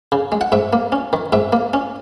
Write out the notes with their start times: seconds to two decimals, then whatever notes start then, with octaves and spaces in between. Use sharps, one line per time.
0.12 C#3
0.32 G#3
0.41 F#5
0.52 G#2 E5
0.73 A#3
0.92 C#4
1.13 D#3
1.33 G#2 E5
1.53 A#3
1.73 C#4